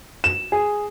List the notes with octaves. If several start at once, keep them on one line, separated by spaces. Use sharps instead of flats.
E7
G#4